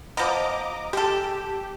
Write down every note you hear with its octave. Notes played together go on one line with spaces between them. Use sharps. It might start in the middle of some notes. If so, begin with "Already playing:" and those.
F3 B3 D#5 A#5 D6
G#3 G4 A4